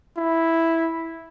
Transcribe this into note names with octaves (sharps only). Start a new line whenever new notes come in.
E4